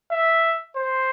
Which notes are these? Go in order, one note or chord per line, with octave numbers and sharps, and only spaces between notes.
E5
C5